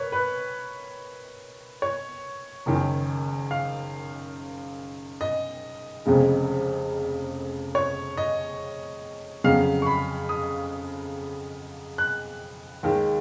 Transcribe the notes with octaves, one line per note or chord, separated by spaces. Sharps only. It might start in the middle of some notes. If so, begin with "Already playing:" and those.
Already playing: A#4 B4 C#5
B4
C#5
F#1 F#2 D#3
F5
D#5
F1 F2 C#3 G#3
C#5
D#5
F2 C#3 F#3 F5
C#6
B5
D#6
F#6
D#2 D#3 G#3